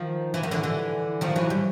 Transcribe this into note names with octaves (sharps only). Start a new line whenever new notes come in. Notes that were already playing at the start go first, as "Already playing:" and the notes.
Already playing: D#3 F3
E3
D#3
D3 E3
D3 E3
D#3 F3
E3 F#3
G3